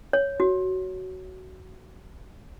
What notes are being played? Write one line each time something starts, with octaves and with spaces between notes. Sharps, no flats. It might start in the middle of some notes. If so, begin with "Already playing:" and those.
C#5
F#4